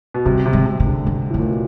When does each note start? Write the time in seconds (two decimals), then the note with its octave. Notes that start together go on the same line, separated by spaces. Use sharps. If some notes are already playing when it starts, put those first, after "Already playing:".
0.14 B2
0.26 C3 G3
0.46 C3
0.53 G#3
0.66 C3
0.80 G#3
0.86 D3
1.06 D3 G#3
1.30 A2
1.34 A#2 A3
1.47 B2